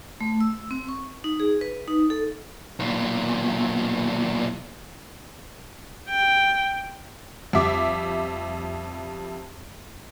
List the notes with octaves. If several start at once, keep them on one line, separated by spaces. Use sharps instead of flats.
A3
E6
C4
C#6
D#4
G#4
B4
D#4
A4
B1 A#2
G5
F2 G3 E5 D6